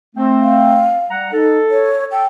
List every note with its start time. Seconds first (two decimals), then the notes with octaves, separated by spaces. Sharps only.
0.15 A3 C4
0.41 F5
1.10 G3 F#5 A#5
1.32 D#4 A4
1.71 C#5
2.12 A4 G5